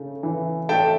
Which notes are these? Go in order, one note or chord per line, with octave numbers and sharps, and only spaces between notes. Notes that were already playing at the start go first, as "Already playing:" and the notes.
Already playing: C#3 A3
E3
A3 G5 A5